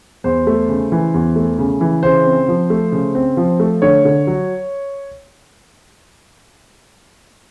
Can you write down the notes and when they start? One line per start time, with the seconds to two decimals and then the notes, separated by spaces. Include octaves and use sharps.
0.24 E2 C5
0.47 A3
0.69 C#3
0.92 E3
1.14 E2
1.36 A3
1.59 C#3
1.81 E3
2.03 C#3 C5
2.25 C4
2.48 F3
2.70 A3
2.92 C#3
3.15 C4
3.37 F3
3.60 A3
3.82 D3 C#5
4.05 D3
4.27 F#3